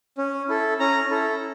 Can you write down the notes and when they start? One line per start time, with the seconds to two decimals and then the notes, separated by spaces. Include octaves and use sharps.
0.18 C#4
0.49 E4 A4
0.80 C#4 A#5
1.11 E4 A4